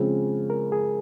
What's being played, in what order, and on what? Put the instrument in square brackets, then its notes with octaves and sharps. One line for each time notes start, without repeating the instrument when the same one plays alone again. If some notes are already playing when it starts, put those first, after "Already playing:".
Already playing: [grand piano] C#3 F3 G#3 C4 [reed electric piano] G#4
[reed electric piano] A#4
G#4